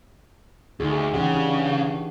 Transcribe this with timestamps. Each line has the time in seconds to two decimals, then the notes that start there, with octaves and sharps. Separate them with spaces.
0.80 D2 D#4 G#4
1.14 C#3 E3 G4 F#5
1.34 D4